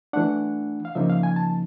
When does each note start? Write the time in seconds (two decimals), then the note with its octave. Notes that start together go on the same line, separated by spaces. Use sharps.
0.13 E3 A3 D4 F#5
0.85 F5
0.95 C#3 F3 A#3 D#4 E5
1.09 F5
1.23 G#5
1.36 A5